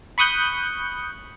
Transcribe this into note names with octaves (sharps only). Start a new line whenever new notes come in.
B5 C#6 D#6 F#6 G6 C#7